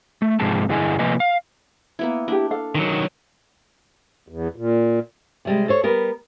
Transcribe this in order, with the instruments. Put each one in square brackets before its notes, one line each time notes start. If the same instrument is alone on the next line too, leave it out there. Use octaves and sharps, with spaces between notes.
[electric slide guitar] A3
G#2 C3 F3 G#3 A5
G2 D3 E4 G#4 D#5 G#5
C3 F3 A#3 B4 D#5 G#5
F5
[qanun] A#3 B3 E4
[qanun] D4 [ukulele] E4 G4
[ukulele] A4 F5
[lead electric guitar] D#3 F#3
[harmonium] E2
A#2
[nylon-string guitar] C3 G3 G#3
A4 C5 C#5
G3 B3 A#4